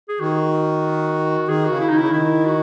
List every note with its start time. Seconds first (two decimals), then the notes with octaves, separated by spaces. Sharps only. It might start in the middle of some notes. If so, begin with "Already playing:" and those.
0.08 G#4
0.20 D#3 F#4
1.49 D#3 G#4
1.65 F#4
1.70 C#3
1.80 E4
1.89 D#3 D#4
1.98 C#3 E4
2.09 D#3 E4
2.45 F#4